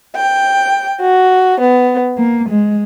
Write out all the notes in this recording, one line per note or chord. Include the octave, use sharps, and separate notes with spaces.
G5
F#4
B3
A#3
G#3